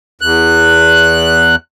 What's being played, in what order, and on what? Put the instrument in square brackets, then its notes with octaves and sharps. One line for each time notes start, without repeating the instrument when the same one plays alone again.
[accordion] E2 F#6